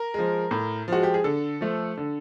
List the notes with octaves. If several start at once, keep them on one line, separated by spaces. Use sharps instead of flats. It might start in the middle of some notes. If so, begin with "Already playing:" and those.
Already playing: A#4
F3 G#3
A2
F3 G#3 F#4
G4
G#4
D3 A4
F3 A3
D3